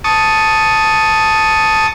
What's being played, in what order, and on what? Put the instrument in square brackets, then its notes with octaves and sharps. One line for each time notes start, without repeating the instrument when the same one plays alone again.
[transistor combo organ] A5 C#6 D#6